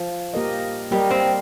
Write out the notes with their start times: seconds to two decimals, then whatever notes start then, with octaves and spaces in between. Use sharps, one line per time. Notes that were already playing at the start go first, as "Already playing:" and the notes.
Already playing: F3
0.34 A#3 G4 A#4 D#5
0.91 G3 A#3 G4 A#4 D#5
1.11 C4